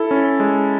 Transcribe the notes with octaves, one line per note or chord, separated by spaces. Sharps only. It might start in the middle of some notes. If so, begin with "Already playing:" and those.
Already playing: E4 A4
C#4
G#3